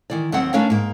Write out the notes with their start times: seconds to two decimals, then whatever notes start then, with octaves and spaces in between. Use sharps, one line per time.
0.10 D#3 E3 D5
0.32 D#2 F#3 C4 F#5
0.53 A3 C#4 D4 A#4 C#5 F5
0.70 G#2 A#3